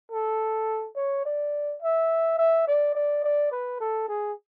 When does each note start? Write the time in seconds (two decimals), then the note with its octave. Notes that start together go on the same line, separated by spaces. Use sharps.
0.12 A4
0.96 C#5
1.25 D5
1.82 E5
2.38 E5
2.68 D5
2.95 D5
3.24 D5
3.52 B4
3.80 A4
4.08 G#4